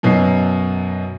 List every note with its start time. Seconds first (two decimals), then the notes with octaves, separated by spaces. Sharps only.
0.03 F#2 B2 F#3 D#4 C7